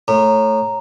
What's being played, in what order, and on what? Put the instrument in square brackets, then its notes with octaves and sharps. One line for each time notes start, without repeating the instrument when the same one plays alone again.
[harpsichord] A2 [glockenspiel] A#5